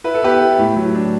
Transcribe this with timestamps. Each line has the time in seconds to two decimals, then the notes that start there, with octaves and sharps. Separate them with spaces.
0.04 E4 B4
0.14 A4
0.23 B3 G4 B4
0.41 E4
0.58 A2
0.76 F#3
0.95 D4